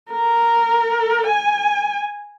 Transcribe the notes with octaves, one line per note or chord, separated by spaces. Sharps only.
A#4
G#5